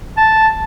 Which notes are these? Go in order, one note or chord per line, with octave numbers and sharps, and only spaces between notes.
A5